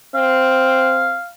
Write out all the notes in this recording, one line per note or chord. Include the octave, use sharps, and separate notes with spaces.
C4 F5